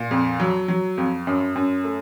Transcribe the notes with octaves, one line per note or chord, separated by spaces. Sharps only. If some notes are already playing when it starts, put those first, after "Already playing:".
Already playing: A#2
F2
F#3
F#3
F2
F#2
F#2
A3